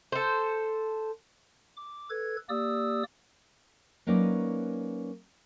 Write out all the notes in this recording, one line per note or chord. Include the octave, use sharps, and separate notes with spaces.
A4 C5
D6
A4 B4 G#6
A#3 G4 D5 D#6 E6
F#3 A#3 C#4 D#4 B4 D5